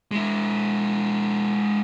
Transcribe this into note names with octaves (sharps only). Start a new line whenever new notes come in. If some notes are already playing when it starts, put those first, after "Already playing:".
G#3 E4